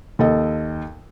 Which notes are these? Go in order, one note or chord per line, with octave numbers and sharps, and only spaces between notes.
D#2 A4 D#5